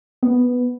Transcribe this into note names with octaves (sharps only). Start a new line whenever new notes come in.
B3